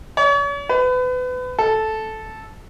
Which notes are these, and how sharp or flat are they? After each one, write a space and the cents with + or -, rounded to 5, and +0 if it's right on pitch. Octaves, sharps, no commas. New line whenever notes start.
C#5 +40
B4 +30
A4 -10